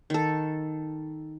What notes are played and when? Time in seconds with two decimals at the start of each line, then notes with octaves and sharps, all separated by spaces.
0.10 D#3 A4